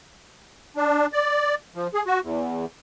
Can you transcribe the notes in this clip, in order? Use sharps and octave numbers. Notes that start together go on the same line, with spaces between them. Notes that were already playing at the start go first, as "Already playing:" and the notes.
D4
D5
F3
G#4
F#4
E2